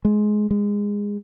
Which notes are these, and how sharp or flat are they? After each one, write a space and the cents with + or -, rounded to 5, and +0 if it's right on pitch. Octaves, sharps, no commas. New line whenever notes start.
G#3 +15
G#3 -20